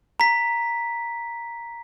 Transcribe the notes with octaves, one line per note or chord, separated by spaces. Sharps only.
A#5 B6